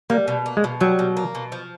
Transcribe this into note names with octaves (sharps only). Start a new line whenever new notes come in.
G3 A#3
B2
A#3
G#3
B2
F#3 G3
B2
A#3
B2
F3